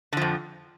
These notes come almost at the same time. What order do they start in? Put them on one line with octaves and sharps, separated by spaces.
D3 F3 F2